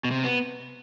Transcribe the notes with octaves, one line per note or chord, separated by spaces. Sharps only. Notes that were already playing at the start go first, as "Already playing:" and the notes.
B2
C3
B3